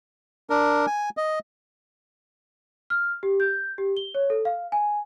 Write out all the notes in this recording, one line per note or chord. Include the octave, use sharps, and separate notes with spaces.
D4 A#4
G#5
D#5
F6
G4
G6
G4
G7
C#5
A4
F5
G#5